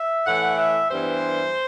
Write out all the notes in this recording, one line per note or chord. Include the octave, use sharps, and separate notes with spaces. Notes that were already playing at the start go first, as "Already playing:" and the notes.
Already playing: E5
A2 E3 A3 F#5
E5
G2 E3 G3 B3 C5